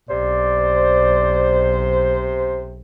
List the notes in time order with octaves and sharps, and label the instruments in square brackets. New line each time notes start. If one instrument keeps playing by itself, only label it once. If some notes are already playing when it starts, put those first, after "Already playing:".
[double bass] B1 [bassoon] C3 [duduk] C5 [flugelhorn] D5